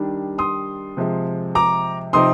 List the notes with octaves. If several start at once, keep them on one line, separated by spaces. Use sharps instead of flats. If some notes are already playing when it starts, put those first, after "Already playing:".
Already playing: D#3 G3 D4
C6 D#6
C3 F3 G#3
A#5 D6
C3 F3 C4 D#4 C6 D#6